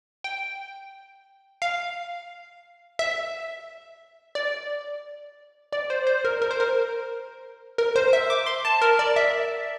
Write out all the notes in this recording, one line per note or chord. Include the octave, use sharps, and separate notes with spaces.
G5
F5
E5
D5
D5
C5
C5
A#4
A#4
C5
A#4
A#4
C5
E5
D6
C6
A5
A#4
D5
E5